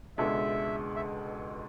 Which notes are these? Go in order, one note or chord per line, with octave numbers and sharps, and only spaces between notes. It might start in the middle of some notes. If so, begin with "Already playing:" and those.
C#2 B2 G#3 D4 A4 E5
E5